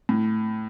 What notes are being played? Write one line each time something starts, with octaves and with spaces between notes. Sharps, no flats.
A2